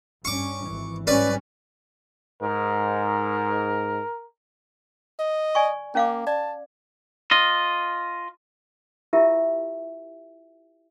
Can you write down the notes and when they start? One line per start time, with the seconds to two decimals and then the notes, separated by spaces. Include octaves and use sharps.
0.25 G2 C#4 C#6 D6
0.65 G#1 E3
1.07 G#2 G3 C#4 B4 D5
2.42 G#2 A#4
5.20 D#5
5.55 D5 G#5 C#6
5.95 A#3 C#4 F5 D6
6.27 D5 A5
7.31 F4 D#5
9.13 E4 F4 G4 A#4 E5